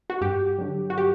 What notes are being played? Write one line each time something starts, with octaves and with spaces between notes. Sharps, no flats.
F#4
G2 G4
D3 F#3
F#4
G4